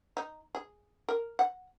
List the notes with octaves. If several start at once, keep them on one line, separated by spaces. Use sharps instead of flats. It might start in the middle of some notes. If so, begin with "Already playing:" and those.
D#4
G#4
A#4
F#5